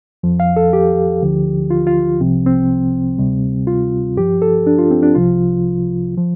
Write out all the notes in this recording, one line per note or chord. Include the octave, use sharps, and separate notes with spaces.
F2 F3
F5
A4
G4
D2 D3 F3
F4
F4
C2 C3 F3 C4
C4
D2 C3 G3
F4
G2 F3 G4
A4
D4
F4
C4
D4
C2 C3 F3 F4
F3